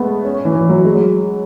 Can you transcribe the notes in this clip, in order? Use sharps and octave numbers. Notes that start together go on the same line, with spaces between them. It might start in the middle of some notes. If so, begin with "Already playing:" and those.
Already playing: G#3 A3 B3
C#4
C#4
E3
E3
F#3
G#3
F#3